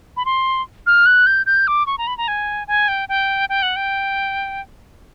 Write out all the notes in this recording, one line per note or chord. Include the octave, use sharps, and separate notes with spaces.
B5
C6
F6
F#6
G6
G6
D6
C#6
A#5
B5
A#5
G#5
G#5
G5
G5
G5
F#5
G5